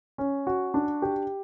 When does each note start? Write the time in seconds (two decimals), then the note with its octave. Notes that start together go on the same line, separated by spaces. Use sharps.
0.18 C#4
0.47 F#4
0.74 D4
1.02 G4